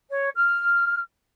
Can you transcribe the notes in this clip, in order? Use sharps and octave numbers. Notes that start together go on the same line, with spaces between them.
C#5
F6